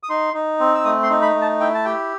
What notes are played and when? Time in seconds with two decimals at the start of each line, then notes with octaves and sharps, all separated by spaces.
0.03 D#6
0.10 D#4 C6
0.34 D#4
0.60 C4
0.75 E6
0.84 A3 D#6
1.03 C6
1.10 D#4
1.22 B5
1.35 A3
1.42 A5
1.60 E4 G5
1.75 A5
1.85 G4 G5